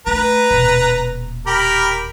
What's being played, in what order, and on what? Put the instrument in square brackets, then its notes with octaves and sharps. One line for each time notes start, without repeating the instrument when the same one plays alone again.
[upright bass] A3 [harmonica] B4 A#5
[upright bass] D#1 B2
[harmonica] G4 A#4 B5